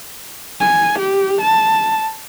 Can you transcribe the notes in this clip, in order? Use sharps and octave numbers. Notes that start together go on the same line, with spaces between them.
G#5
G4
A5